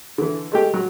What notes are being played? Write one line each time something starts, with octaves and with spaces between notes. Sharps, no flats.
D3 E3
G#3 A3 G4
F#3